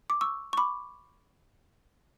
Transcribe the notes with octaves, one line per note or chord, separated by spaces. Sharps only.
D6
C#6 E6
C#6
B5 D6